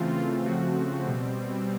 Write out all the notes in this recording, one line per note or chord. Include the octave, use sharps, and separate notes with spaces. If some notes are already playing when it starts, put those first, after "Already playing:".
Already playing: C#3 E3 A3 C4 F4
F4
C#3 F3 A3 C4 F#4
B2 G3 C4